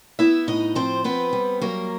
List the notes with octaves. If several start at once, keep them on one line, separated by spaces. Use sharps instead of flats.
B3 E4 E5
A2 D#4 D#5
F3 C4 C5
B3 C4 B4
G3
F#3 A#3 A#4